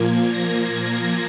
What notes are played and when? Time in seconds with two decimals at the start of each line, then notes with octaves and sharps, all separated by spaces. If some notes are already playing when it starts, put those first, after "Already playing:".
Already playing: A#2 F3 A#3 G#6
0.34 A#6
0.75 G#6